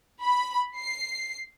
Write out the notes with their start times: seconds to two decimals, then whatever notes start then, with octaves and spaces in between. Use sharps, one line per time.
0.22 B5
0.78 C7